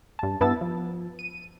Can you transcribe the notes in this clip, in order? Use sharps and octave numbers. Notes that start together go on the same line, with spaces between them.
G2 A5
G2 B3 E4 A5 E6 A6
F3
D#7